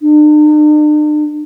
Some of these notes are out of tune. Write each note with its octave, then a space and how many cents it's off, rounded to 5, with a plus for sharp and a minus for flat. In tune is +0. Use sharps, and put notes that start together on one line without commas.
D4 +45